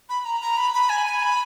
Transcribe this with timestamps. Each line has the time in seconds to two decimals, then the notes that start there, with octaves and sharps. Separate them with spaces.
0.09 B5
0.25 A#5
0.41 A#5
0.57 B5
0.74 B5
0.89 G#5
1.06 G#5
1.23 B5